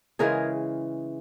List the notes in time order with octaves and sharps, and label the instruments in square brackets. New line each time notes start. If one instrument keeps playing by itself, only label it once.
[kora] C#3 E3 G#3 G#4 A#4